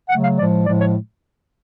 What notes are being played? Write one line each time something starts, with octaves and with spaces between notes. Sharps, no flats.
C#3 F#3 A3 F#5
F5
A2 F3 G#3 D5
A2 F3 G#3 D5
C#5